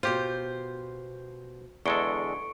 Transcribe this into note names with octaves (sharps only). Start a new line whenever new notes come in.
B2 F4 G4 C5
E2 D3 G#3 A4 C#6 C#7 D7